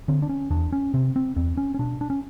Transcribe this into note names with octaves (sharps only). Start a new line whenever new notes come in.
D3 C4
D4
C#4
E2 D4
C#4
C3 C4
C4
E2 C4
C#4
C#4
B2 D4
D4
C#4